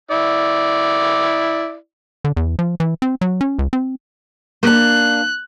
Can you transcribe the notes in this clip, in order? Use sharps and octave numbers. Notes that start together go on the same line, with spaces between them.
E4 D5
D3
E2
F3
E3
C4
F#3
C#4
C#2
C4
A#3 D4 F#6